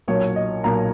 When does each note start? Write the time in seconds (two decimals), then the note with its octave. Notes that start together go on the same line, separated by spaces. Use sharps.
0.08 B1 A#2 F#3 C#5
0.36 D#5
0.64 B1 A#2 F#3 A#5